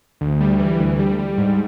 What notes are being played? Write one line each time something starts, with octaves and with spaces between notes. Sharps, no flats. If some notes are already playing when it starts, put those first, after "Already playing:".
D2
G3
E3
D2
G3
G3
G#2